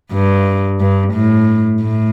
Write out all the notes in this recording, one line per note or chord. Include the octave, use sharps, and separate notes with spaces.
G2
G2
A2
A2